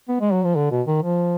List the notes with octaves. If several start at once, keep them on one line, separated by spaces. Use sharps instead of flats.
B3
G#3
F#3
F3
D3
B2
D#3
F3